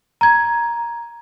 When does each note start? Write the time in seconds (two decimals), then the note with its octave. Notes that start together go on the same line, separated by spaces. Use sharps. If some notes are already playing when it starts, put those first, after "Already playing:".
0.21 A#5 G#6